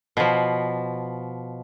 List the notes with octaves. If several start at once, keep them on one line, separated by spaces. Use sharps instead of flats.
B2 F3